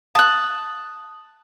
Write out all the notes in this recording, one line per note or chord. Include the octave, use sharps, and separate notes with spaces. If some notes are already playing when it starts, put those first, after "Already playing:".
A5 D#6 F#6